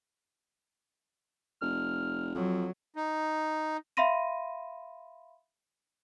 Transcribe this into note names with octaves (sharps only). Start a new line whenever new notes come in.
F1 F6
F2 F#3
D#4
E5 F5 B5 C6 A#6 D#7